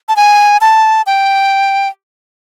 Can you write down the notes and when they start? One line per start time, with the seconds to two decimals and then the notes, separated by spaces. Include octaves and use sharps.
0.09 A5
0.16 G#5
0.61 A5
1.07 G5